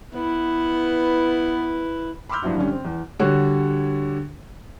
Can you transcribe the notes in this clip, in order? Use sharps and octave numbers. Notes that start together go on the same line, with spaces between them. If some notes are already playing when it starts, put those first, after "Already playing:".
B3 E4 B4
B5 C6 D6 E6 F6 G6
G2 F3 F#3 E4 F#4
G2 D3 G3 C#4
C4
E2
D3 G3 F#4 C#5